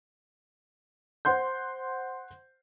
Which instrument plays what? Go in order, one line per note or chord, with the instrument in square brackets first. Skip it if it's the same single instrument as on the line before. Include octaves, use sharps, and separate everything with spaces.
[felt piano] C5 F#5 C6 G6